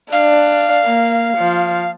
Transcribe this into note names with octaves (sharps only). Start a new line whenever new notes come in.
D4 F5
A#3
F3